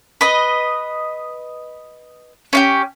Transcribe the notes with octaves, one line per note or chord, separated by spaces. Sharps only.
B4 D#5
C#4 F4 G4